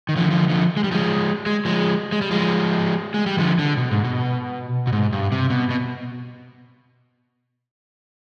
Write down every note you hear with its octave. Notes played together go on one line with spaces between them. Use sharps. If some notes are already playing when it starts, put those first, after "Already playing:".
D#3
D3 F3
D3 F3
D3 F3
G#3
G3
F3 G#3
G#3
F3 G#3
G#3
G3
F3 G#3
G#3
G3
D3 F3
D3
B2
G#2
B2
B2
G#2
G2
C3
B2
B2